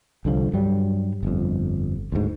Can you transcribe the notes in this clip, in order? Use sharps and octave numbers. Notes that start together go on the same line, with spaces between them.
C2 D3 F3
G2 F#3 G3
G1 F2
D2 G#2